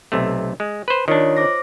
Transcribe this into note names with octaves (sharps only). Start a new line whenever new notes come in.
B1 C3 A3
G#3
B4 C5
D#3 D4 F4 C#5 D#5
C5 D6 A#6